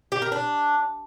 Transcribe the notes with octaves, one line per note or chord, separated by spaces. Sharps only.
G4
A#4
D4